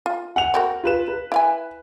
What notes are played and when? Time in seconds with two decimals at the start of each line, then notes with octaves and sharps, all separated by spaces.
0.06 F4
0.36 F#5 F7
0.54 C4 F#4 A#4
0.84 F4 B4 E7
1.08 B4
1.32 E4 F5 G#5